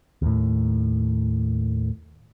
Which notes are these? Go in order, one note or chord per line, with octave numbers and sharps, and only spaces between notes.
D#2 A2